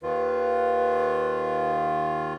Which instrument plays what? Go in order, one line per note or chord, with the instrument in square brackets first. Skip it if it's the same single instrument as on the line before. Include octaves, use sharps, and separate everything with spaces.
[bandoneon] D#2 D#3 F4 [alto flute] B4